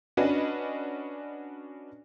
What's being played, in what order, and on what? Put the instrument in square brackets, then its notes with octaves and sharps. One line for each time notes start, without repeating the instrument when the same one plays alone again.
[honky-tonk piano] C#4 D4 F#4 B4 D#5